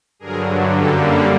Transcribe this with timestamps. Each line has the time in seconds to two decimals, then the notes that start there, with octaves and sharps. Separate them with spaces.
0.19 G2 D3 F#3 G#4 A#4
0.72 F#2 D3 G3 A#3 G4 A4